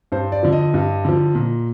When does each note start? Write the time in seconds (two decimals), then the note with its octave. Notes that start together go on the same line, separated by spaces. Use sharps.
0.12 G2 C5
0.32 D5
0.43 D3 F3
0.53 D#5
0.74 G2
1.05 D3 F3
1.35 A#2